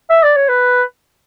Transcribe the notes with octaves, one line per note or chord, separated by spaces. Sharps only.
E5
D5
C#5
B4